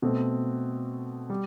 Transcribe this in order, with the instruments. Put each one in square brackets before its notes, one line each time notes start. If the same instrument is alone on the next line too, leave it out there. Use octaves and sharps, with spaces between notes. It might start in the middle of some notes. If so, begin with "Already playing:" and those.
[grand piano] B2 A3 C4
G3